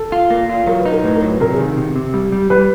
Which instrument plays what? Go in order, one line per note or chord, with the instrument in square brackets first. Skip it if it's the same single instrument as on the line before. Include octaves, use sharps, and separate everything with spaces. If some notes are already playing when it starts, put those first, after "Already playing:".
Already playing: [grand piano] A4
[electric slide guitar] F4
A#3
F4
[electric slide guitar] F#3 [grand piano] A#4
[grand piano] B4
[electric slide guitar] D#4
[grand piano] A#4
[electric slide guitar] A2 [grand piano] B4
[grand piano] A#4
[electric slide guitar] F#3
[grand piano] B4
[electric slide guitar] C3 [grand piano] A#4
[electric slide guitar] D#3 [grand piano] G#4
[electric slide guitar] C3
C3
G3
G3
[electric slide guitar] G3 [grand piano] B4